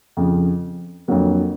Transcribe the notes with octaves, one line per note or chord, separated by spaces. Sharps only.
F2 C#3 F3
F2 D3 F#3 A#3